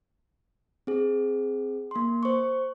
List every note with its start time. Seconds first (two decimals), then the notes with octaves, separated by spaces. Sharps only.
0.87 C4 G#4
1.91 A#3 C6
2.23 C5 C#6